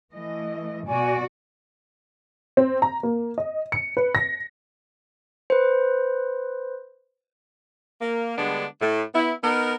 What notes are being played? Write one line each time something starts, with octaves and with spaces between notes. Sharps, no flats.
E3 A3 D#5
B2 F#4 D5 G#5
C4
A#5
A#3
D#5
C#7
B4
A#6
B4 C5
A#3
D3 G3 G#3 B3 D4
A2
B3 E4
B3 D#4 A#4